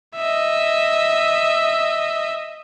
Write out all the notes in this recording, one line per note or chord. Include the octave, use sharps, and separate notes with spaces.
D#5 E5